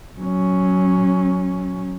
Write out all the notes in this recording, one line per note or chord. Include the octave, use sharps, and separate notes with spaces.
F#3 C#4